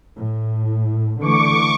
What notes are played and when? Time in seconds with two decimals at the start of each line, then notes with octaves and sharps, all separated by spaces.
0.18 A2
1.21 D3 E3 A3 C#6 D6